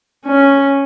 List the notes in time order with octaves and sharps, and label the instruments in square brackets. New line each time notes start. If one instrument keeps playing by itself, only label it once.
[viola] C#4